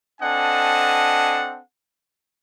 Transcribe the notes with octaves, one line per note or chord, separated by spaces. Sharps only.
C4 D4 A4 D#5 F#5 G#5